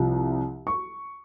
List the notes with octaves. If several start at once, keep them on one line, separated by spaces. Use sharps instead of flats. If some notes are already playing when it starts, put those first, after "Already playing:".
Already playing: C2 C3 F3
C#6